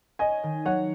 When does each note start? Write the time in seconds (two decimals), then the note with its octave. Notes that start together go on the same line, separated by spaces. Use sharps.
0.19 C#4 D#5 G#5
0.43 D#3
0.65 F#3 C#5 F#5